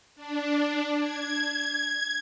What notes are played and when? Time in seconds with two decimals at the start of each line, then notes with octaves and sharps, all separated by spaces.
0.16 D4
0.99 G#6